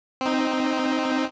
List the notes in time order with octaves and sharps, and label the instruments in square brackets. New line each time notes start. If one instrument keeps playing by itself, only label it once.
[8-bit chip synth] C4 D#4